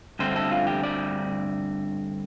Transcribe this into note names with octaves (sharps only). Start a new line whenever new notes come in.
G2 D3 A3 C4 C5
A4
F4
G4
D5